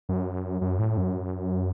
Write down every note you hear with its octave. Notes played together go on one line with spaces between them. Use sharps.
F#2
F#2
A2
F#2